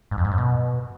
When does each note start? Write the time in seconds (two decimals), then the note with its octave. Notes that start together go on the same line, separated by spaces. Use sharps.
0.11 G#2
0.18 F2
0.25 G#2
0.31 F#2
0.38 B2